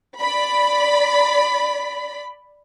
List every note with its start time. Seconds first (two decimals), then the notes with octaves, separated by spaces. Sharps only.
0.20 D5 B5